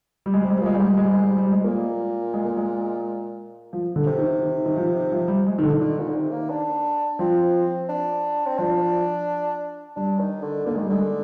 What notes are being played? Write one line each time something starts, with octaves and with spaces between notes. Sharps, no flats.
G3
G#3
C3 G3
G#3
G3
A#2 G#3
G3
G#2 G#3
G3
G#3
G3
G#3
G3
G3
G#3
A#2 A#3
G#3
A#3
G#3
F3
D3
C3
D#3
D#3
D#3
F3
F3
G3
G#3
D#3
D3
D3 D#3
A#2
D3
C3
A#3
D4
F3 C4
D4
C4
F3 D4
G3 D4
D#3
D3
D3 A#3
D#3 G#3
G3
D3 G#3